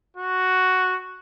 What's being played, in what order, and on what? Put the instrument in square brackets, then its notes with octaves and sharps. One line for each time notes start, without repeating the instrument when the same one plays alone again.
[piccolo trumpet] F#4